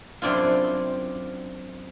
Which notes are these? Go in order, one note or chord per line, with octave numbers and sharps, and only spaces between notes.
F#2 C3 C4 D4 E4 F4